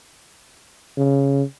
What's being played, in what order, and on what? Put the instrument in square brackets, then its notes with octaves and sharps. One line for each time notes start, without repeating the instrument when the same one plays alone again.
[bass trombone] C#3